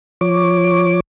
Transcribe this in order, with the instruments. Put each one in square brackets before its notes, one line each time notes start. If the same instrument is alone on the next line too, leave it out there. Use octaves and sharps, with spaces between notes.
[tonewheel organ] F3 C#5 D6